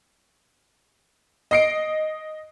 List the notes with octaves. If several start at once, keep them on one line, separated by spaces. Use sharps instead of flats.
D#5 C7 D7